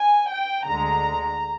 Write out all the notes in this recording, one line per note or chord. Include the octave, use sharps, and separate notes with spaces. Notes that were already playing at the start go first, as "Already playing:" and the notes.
Already playing: G#5
G5
D2 D3 G#3 A#5